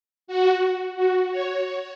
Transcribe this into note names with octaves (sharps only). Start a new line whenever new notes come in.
F#4
F#4
C#5